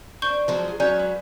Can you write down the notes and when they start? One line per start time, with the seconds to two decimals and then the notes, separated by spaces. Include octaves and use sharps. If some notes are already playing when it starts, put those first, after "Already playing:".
0.22 D4 C5 C#6 G6 G7
0.48 F3 F#3 G#3
0.68 G#4
0.80 F#3 C#4 C#5 D5 G#5 G6
0.96 G#3 B4